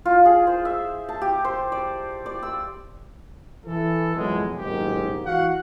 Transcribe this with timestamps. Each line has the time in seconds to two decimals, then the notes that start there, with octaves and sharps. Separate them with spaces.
0.05 F4
0.25 G#4
0.47 C5
0.65 E5
1.09 A5
1.21 G4
1.45 C5
1.72 D5
2.26 D5
2.43 E6
3.66 E3 A4
4.16 F2 B2 E3 F#3 G#3
4.57 F#1 B1 F2 G#2 D#3 G4
5.26 E3 F#4 F5 F#5